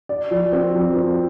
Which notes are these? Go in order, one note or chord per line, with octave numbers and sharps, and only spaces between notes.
D5
F3
C4
F3
C4